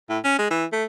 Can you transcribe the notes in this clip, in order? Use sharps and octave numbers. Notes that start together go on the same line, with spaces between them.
A2
C#4
G#3
E3
A3